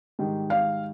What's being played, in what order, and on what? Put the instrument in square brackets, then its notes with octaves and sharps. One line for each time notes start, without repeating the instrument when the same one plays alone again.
[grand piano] G#2 D#3 G3
[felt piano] F5